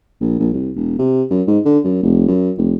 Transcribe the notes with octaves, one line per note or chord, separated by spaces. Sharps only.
A#1
A#1
C2
E1
C3
F#2
G#2
D3
F#2
F1
F#2
F1